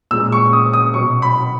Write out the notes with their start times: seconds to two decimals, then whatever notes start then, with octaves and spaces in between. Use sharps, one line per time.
0.11 A#2 G#3 E6
0.32 C#6
0.53 D#6
0.73 D#6
0.94 B2 F#3 C#6
1.22 B5